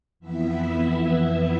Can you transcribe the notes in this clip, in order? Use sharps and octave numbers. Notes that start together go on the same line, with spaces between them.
F2 E3 B3 E4 E5